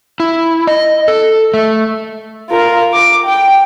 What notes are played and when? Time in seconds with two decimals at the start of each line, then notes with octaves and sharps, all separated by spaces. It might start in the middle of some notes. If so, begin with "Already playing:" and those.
0.20 E4
0.67 D#5
1.08 A4
1.54 A3
2.50 F4 A#4
2.93 D6
3.25 G5